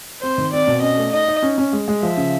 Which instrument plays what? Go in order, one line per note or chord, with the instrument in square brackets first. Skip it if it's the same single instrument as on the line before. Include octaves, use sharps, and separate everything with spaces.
[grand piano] C4 [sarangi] C5
[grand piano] D#3
[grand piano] C4 [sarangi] D5
[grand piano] B2
[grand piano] C#4 [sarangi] D#5
[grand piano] A3
[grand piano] D#4 [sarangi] D#5
[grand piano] D#4
C#4
C#4
G#3
G#3
[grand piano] F3 [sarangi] E5
[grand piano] C#3